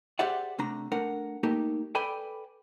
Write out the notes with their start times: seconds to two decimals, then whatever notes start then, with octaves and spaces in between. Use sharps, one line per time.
0.19 G4 G#4 C5 D5 E5 F#5
0.59 C3 A3 D4 A#5
0.92 A3 D4 A#4 F#5
1.43 A3 A#3 D#4 G4 A4 A#4
1.95 A4 B4 D5 G5 G#5 B5